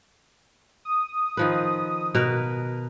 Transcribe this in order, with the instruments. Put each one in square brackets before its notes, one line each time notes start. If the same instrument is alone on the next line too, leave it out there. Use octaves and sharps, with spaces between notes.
[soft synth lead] D#6
[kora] D#3 F3 B4
B2 A#4 B4